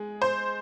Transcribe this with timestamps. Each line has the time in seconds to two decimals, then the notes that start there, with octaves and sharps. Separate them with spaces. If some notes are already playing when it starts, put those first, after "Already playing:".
Already playing: G#3 G#4
0.22 C5